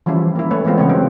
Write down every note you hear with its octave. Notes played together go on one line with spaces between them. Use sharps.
E3 F3 G3 C#4 E4
A#3 E4
A3 B4 C#5
E3 G#3 B3 C4 F4
C#3 B3 C#5
F#3 C4